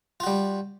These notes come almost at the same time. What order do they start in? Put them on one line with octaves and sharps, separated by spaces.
F4 F#4 G3